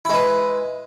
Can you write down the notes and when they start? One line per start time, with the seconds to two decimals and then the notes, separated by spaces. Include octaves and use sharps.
0.05 E4
0.09 G#3
0.14 B4